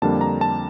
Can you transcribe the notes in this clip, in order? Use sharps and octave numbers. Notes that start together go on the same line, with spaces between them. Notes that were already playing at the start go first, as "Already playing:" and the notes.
F2 D3 G3 A#3 D4 A5
A#5
A5